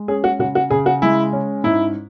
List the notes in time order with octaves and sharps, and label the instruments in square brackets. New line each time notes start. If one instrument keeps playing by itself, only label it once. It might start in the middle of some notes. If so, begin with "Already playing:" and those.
Already playing: [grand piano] G#3
C#4 G#4
F#4
C#3 F#4
F#4
C#3 G#4
F#4
G#3 E4
C#4
G#2 E4